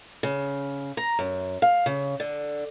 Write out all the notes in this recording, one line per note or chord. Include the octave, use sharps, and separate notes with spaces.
C#3
A#5
F#2
F5
C#3
D3